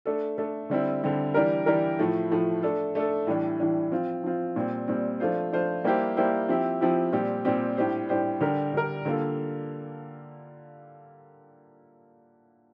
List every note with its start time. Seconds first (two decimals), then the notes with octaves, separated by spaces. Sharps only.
0.05 A3 D4 A4
0.38 A3 D4 A4
0.70 D3 G3 C4 E4
1.03 D3 G3 C4 E4
1.34 E3 G3 D4 G4 A#4
1.66 E3 G3 D4 G4 A#4
1.99 A2 F3 A3
2.31 A2 F3 A3
2.63 A3 D4 A4
2.95 A3 D4 A4
3.27 A2 E3 G3 D4
3.60 A2 E3 G3 D4
3.92 F3 C4 F4
4.24 F3 C4 F4
4.56 A#2 G3 C4
4.88 A#2 G3 C4
5.20 F3 A3 D4 F4 C5
5.52 F3 A3 D4 F4 C5
5.84 G3 A#3 E4 G4 C5
6.16 G3 A#3 E4 G4 C5
6.49 F3 C4 E4 G4
6.81 F3 C4 E4 G4
7.12 A#2 G3 C4 G4
7.45 A#2 G3 C4 G4
7.77 A2 G3 D4 G4 C5
8.09 A2 G3 D4 G4 C5
8.41 D3 G3 D4 G4 A#4
8.73 D3 G3 D4 G4 A#4
9.05 D3 G3 A#3 F4 A4